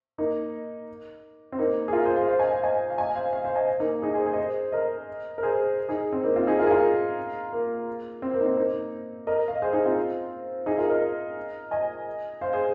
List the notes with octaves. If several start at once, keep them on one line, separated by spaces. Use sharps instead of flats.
A#3 D#4
C4
A#3 D#4
G#4
F4 A#4
G#4 C5
C5 F5
C5 F5
D#5 G#5
C5 F5
D#5 G#5
F5
D#5 G#5
C5 F5
C5 F5
C5 F5
D#5 G#5
A#3 D#4
D#4 G#4
G#4 C5
G#4 C5
D#5
G#4 C5
A#4 D#5
A#4
G#4 C5
D#4 G#4
C4
A#3 D#4
C4 F4
D#4 G#4
F4 A#4
G#4
F4 A#4
A#3
C4
A#3
D#4
C4
A#3 D#4
A#4 D#5
F5
D#5
G#4 C5
D#4 G#4
C4 F4
D#4 G#4
F4 A#4
A#4 D#5
D#5 G#5
C5 F5
G#4 C5